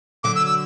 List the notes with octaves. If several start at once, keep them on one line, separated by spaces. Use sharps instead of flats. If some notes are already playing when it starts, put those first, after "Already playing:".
D3 F#3 D6
E6
E6